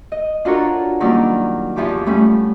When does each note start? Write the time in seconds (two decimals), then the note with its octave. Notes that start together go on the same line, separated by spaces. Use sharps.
0.12 D#5
0.45 D4 F4 F#4 A4 A#4 C#5
1.00 D#3 F#3 G3 A#3 C#4 D5
1.76 E2 E3 F3 G4 D6
2.06 F3 G3 A3 C#4